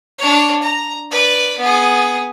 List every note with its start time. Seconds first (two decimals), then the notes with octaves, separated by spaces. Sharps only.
0.18 D4 C#5
0.62 A#5
1.11 B4 D5
1.58 B3 G#4